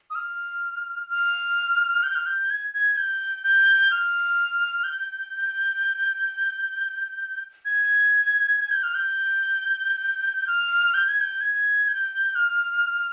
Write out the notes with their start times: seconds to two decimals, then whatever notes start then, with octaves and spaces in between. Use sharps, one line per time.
0.10 D#6
0.15 F6
1.09 F6
2.03 G6
2.15 F6
2.26 G6
2.50 G#6
2.74 G#6
2.97 G6
3.44 G6
3.91 F6
4.84 G6
7.65 G#6
8.60 G#6
8.71 G6
8.83 F6
8.94 G6
10.47 F6
10.94 G6
11.08 G#6
11.21 G6
11.41 G#6
11.88 G6
12.35 F6